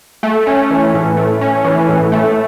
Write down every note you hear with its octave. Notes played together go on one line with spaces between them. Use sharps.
A3
C#4
E3
A2
A3
C#4
E3
A2
A3